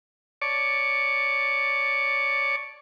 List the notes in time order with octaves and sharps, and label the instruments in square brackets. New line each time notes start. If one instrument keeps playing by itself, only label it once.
[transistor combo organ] C#5 D5 A5 C#6 D6